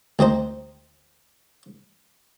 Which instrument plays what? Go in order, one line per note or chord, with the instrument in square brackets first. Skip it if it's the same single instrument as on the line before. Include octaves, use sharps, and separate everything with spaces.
[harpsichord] D2 C4 D#4 C5